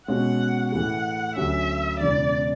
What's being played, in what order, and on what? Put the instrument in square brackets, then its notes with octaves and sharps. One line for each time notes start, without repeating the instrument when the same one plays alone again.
[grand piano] B2 G#3 C#4 F#4 [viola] F#5
[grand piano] A2 E3 A3 E4 G#4 [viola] F#5
[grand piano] D2 D3 F#3 C#4 [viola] E5
[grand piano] E1 E2 C#3 [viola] D5